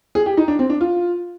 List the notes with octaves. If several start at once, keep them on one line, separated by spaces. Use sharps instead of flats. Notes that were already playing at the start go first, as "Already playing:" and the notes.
G#4
G4
D#4
D4
C4
D4
F4